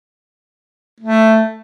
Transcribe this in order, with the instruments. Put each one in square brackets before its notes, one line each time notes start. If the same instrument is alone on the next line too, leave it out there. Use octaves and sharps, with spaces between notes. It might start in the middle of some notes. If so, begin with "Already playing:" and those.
[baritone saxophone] A3